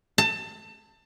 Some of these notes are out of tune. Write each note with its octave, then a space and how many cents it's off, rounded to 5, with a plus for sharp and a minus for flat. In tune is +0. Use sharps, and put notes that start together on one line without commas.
A5 +25